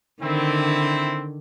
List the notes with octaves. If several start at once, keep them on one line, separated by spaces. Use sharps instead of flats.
D3 D#3 C4 E4